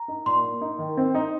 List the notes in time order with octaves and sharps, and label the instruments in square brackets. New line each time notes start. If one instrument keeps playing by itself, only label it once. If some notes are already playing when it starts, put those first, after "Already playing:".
Already playing: [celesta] A#5
[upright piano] D#4
[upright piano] A#2 [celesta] C6
[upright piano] A#3
D#4
D#3
C4
D#4